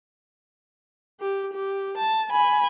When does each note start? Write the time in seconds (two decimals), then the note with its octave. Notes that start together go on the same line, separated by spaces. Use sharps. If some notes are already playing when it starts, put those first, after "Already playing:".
1.20 G4
1.53 G4
1.98 A5
2.31 G#5 B5